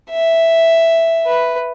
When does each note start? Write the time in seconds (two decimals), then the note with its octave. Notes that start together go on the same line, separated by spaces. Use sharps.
0.11 E5
1.27 B4